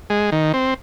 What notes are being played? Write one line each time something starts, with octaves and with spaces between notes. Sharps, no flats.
G#3
D#3
C4